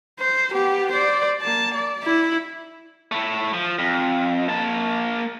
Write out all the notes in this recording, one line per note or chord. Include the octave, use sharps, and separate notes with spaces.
C5
B3 G4
C5 D5
A#3 A5
D5
E4
A3 E4
F3
F2
A#3 A5